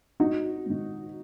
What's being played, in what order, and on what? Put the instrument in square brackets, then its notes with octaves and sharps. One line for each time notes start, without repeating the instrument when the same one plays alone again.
[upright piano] G#1 D#4 F#4
G#2 D#3